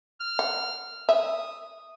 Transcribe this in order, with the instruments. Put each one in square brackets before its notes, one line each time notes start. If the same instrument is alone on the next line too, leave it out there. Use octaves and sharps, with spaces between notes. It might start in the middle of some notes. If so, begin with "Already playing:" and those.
[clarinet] F6
[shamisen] F#5
[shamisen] E5 [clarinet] D#6